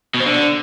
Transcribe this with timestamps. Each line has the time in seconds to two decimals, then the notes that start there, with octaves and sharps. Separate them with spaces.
0.14 B2
0.20 C4
0.26 D3